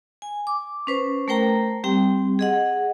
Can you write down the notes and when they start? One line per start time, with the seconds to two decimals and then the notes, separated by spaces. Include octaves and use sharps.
0.22 G#5
0.47 D6
0.87 C#4 B4 C5
1.28 A3 A#4 C5 G5 A#5
1.84 G3 C4 G4 G5
2.39 G#4 D#5 F#5